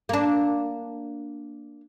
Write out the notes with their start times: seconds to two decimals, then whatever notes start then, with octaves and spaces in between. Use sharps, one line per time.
0.09 A#3 D4